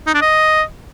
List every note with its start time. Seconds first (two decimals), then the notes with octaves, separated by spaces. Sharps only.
0.07 D#4
0.14 D4
0.22 D#5